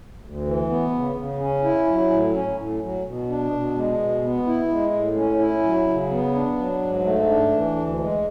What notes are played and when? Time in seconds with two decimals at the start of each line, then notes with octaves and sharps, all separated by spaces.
0.22 D2
0.46 E3
0.69 B3
0.93 C#3
1.16 C#3
1.40 C#4
1.64 E4
1.86 F#3
2.10 A2
2.34 C#4
2.57 A2
2.81 F#3
3.05 B2
3.28 D4
3.51 B2
3.74 G#3
3.99 B2
4.22 B3
4.46 E4
4.69 G#3
4.93 A2
5.16 C#4
5.39 E4
5.63 F#3
5.87 C#3
6.10 B3
6.34 D4
6.57 F#3
6.81 G#2
7.04 A3
7.29 D4
7.52 E3
7.76 D2
7.99 G#3